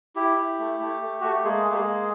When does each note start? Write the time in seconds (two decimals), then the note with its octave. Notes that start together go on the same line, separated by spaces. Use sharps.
0.16 E4 G4
0.37 E4
0.59 A3
0.80 A3
1.02 A3
1.20 A3 F#4
1.32 G4
1.44 G#3 A#3 G#4
1.66 A#3
1.72 G4
1.76 G#3 G#4
1.88 A#3